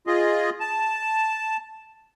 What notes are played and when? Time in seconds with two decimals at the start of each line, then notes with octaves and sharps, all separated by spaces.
0.07 F4 G#4 D#5
0.60 A5